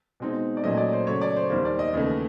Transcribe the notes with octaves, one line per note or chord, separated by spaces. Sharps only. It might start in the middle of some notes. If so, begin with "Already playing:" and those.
B2 G#3 C4 D#4
D5
A#2 F#3 A3 C#4 D#5
D#5
D5
C5
C#3 F#3 A3 C#5
D5
C5
D#2 D#3 G3 A#3 C5
D5
D#5
D#2 C#3 E3 A3